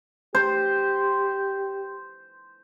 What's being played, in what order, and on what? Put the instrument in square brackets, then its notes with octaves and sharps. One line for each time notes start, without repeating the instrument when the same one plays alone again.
[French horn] G4 [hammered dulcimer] C5